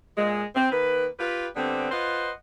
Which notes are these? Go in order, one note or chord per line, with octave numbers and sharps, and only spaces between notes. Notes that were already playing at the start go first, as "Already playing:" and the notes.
A#2 G#3
C4
D#3 A#3 B4
F4 G4 B4
D3 G3 B3 C4
F4 B4 C5 D#5 F#5